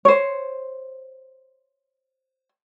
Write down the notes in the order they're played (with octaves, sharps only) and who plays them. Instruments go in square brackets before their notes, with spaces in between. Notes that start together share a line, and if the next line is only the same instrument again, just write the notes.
[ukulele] C5 C#5